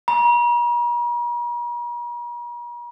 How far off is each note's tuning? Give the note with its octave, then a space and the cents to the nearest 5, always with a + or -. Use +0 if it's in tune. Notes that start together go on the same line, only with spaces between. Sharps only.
A#5 +45